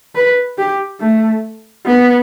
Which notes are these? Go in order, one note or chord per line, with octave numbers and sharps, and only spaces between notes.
B4
G4
A3
B3